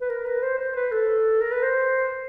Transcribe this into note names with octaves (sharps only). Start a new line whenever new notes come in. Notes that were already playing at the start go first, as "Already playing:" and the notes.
B4
A#4
B4
C5
C5
B4
A4
A#4
B4
C5